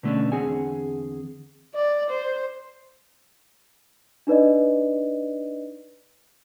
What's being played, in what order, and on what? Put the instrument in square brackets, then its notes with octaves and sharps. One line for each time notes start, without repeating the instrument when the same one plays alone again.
[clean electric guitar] B2 D3 A3 A#3 C#4 D4
E2 D3 C4 G#4 F#5 G#5
[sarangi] D5
C5
[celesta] D4 D#4 B4 D5 D#5